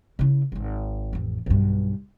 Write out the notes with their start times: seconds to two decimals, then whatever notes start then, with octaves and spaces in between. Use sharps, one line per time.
0.19 C#3 E4
0.52 D1 G#1
1.13 A1 F2
1.46 B1 G2